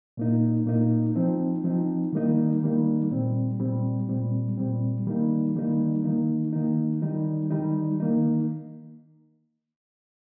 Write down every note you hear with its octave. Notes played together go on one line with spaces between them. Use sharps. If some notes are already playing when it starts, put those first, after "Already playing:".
A#2 A#3 D#4
A#2 A#3 D#4
F3 C4 D#4
F3 C4 D#4
D#3 G3 A#3 D#4
D#3 G3 A#3 D#4
A#2 G3 C4
A#2 G3 C4
A#2 G3 C4
A#2 G3 C4
D#3 G3 A#3 D#4
D#3 G3 A#3 D#4
D#3 A#3 D#4
D#3 A#3 D#4
D#3 G3 D#4
D#3 G3 D#4
D#3 A#3 D#4